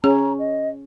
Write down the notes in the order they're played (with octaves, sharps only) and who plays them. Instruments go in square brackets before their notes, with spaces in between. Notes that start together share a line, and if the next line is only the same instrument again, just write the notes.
[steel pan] C#4 [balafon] G#4 [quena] A#5
[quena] D#5